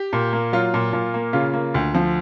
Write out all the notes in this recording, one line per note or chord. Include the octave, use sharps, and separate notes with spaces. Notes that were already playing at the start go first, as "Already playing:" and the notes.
Already playing: G4
A#2
A#3
F#3 F4
A#2
A#2
A#3
C#3 F4
A#3
D2
F3